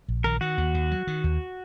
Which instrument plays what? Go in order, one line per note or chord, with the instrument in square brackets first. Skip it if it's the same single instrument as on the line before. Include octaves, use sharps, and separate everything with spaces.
[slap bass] A#1
[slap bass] D#3 [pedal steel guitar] A#4
[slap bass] D#3 [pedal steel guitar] F#4
[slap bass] D#2
D#2
F#3
D#3
D#2